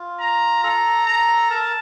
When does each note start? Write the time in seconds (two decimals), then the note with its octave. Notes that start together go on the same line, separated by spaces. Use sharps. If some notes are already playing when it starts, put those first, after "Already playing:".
Already playing: F4
0.20 A#5
0.63 A4 A#5
1.06 A#5
1.50 A#4 A5